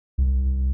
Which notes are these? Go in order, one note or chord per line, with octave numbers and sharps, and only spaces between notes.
C2